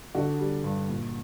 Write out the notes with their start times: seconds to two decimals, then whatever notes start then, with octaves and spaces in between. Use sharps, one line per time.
0.15 D3 F#4
0.39 G3
0.64 G2
0.88 A#2